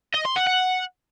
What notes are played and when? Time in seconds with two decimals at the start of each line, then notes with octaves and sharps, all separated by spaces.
0.15 D#5
0.25 C6
0.36 F#5
0.47 F#5